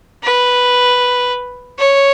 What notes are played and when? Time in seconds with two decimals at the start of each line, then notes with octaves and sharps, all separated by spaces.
0.23 B4
1.78 C#5